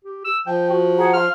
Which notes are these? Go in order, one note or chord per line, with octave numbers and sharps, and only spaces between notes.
G4
E6
F3 G5
F#4
G#4 F#5 A#5
F5 C6 F6